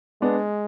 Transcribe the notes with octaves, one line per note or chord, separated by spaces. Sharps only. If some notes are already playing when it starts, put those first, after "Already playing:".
G#3 B3 D4